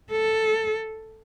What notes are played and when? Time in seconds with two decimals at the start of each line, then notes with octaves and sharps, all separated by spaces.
0.11 A4